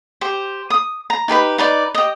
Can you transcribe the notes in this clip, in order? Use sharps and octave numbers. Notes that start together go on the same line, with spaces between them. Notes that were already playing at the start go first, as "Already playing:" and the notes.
G4 C5
D#6
A#5
D#4 G4 B4 B5
D#4 B4 D5
G4 D#5